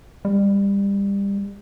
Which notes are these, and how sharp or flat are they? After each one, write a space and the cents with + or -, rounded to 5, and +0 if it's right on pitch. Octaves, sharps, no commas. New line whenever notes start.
G3 +25